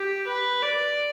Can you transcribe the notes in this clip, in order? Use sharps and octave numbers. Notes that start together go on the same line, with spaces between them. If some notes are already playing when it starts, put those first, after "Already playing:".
Already playing: G4
B4
D5